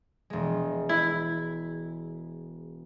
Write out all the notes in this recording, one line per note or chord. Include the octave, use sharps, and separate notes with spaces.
E1 G#3
E4